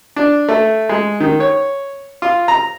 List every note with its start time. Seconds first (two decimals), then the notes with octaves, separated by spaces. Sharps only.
0.16 D4
0.49 A3
0.89 G#3
1.20 D#3
1.40 C#5
2.22 F4
2.48 A#5